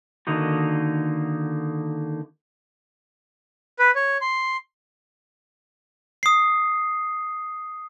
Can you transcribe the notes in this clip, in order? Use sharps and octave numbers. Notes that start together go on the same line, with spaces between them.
D3 D#3 A#3 D#4 F#4
B4
C#5
C6
D#6 C7